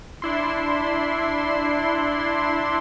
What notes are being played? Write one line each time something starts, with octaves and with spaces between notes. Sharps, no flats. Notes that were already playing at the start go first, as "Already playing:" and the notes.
D4 E4 C6